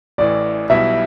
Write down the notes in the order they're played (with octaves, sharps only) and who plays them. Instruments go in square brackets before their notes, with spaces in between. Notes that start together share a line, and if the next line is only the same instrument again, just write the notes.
[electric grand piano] A1 A2 E3 [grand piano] D5
[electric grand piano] B1 B2 G3 E4 [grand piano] E5